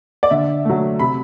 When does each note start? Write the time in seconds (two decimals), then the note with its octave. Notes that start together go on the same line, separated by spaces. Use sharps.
0.23 D5
0.31 D3 E5
0.65 F#3 A3
0.99 C3 B5